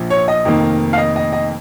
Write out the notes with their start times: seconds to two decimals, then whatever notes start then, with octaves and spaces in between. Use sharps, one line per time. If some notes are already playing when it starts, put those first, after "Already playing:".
Already playing: A#1 A#2 F3
0.10 C#5
0.28 D#5
0.45 F1 F2 D#3 A#3
0.93 F5
0.98 D#5
1.16 D#5
1.33 D#5